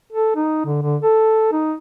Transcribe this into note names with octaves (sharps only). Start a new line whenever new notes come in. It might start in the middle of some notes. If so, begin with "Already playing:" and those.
A4
D#4
D3
D3
A4
D#4